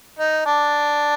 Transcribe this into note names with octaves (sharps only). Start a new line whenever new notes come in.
D#4
D4